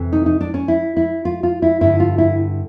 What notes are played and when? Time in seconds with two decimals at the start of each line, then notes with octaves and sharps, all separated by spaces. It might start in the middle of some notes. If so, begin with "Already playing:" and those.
Already playing: F2 C3 E3
0.12 D#4
0.26 D#4
0.41 D4
0.54 C#4
0.68 E4
0.97 E4
1.25 F4
1.43 F4
1.62 E4
1.81 G2 D3 E4
2.00 F4
2.18 E4